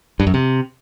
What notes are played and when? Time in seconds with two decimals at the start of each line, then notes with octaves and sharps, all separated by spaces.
0.20 G2
0.27 F#2
0.34 C3